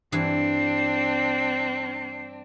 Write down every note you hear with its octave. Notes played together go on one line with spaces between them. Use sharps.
G2 E3 C4 D4 C7